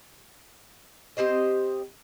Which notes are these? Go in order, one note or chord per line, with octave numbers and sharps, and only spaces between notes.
C4 G4 C5 D#5